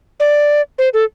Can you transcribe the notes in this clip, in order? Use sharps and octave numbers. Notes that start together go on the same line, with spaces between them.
D5
C5
A4